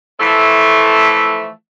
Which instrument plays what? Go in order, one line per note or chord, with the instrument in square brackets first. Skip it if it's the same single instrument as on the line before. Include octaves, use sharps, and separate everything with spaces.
[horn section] E3 F3 A3